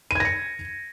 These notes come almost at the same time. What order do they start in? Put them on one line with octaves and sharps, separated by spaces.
D#7 G#6 A#6 C#7